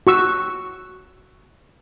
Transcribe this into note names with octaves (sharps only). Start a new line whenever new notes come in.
F#4 C#6 E6